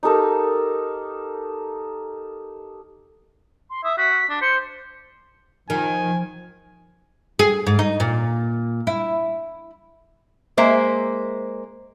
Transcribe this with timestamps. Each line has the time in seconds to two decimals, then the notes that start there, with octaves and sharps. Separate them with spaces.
0.03 D#4 G4 A4 A#4
3.70 C6
3.84 E5 D#6
3.98 F#4 B6
4.29 D4
4.42 C5 C#7
5.70 D#3 F3 G#5
7.39 G#4
7.67 G#2
7.79 D#4
8.00 A#2
8.87 E4
10.57 G#3 A#3 C5 E5